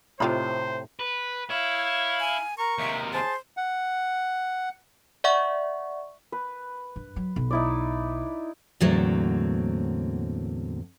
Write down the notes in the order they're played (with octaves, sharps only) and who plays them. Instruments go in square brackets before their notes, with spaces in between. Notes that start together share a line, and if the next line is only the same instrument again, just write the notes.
[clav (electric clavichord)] A2 C3 [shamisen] D#3 F4 B5 [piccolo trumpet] C5
[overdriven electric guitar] B4
[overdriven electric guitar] E4 [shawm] C#5 [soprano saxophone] F5
[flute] G#5
[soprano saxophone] A#4 [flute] A#5 [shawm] C#6
[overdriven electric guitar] D#2 C3 [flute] E5
[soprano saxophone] G#4 [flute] C5 [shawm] A5
[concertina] F#5
[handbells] D5 E5 F#5 C#6
[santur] B4
[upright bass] G2
F#3
B1
[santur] D#4 E4 D5
[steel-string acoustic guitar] E2 A2 D3 F#3 A#3 C4